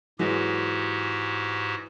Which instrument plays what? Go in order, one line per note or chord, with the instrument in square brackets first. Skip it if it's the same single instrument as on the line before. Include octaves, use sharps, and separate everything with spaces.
[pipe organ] G#2 F#4 G4 [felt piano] E3 F#3 G#3